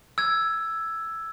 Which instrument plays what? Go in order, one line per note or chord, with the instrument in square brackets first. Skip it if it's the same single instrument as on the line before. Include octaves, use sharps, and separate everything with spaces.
[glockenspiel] E6 G#6